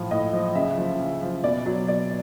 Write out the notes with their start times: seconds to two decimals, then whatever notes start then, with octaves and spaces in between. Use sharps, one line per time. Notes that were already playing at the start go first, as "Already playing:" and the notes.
Already playing: A2 F3
0.11 A2 D#5
0.33 F3
0.55 C#3 E5
0.78 F3
1.00 C#3
1.21 F3
1.43 B2 D5
1.66 F#3
1.88 B2 D5